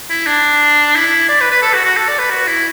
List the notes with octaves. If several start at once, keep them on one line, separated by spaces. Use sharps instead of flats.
E4
D4
E4
D5
B4
B4
A4
F#4
F#4
A4
D5
B4
F#4
E4